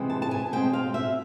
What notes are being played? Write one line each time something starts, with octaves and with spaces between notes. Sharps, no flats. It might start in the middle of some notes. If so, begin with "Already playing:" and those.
Already playing: C3 E3 G#3 C4
A5
A5
G#5
B2 G#3 C4 G5
F5
E5